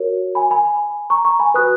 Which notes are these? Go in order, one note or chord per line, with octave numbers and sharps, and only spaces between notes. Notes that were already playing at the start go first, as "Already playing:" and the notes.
Already playing: F#4 A#4 C#5
G#5 B5
G#5 B5
A#5 C#6
A#5 C#6
G#5 B5
F#4 B4 D#6 F#6